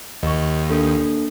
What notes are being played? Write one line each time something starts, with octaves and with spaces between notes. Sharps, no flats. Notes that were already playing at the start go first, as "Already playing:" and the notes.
D#2 D#5 C#6
A#3 D4 A4